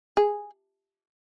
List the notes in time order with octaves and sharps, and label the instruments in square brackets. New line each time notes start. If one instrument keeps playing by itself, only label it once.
[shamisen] G#4